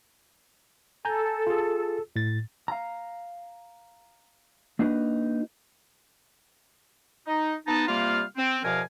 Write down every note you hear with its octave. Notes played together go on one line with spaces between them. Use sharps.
A4 G#5 A#5 G6
F4 G#4
A2 A6
F5 A#5
A#3 D4 D#4 F#4 B4
D#4
B3 D#4 A5
C3 G3 A#3 F4 F5 F6
C4
E2 B2 F3 A#4 F5 G#5